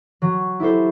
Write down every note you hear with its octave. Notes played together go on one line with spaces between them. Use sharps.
F#3
E4 G4 A4 C5